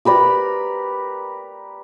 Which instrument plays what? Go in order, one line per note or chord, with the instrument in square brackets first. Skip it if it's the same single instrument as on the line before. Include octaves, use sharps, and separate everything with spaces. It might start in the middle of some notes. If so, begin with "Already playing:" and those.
[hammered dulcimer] G4 A#4 B4 D5